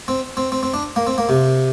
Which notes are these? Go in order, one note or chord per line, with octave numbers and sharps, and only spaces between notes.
C4
C4
C4
C4
D4
A#3
C4
A#3
C3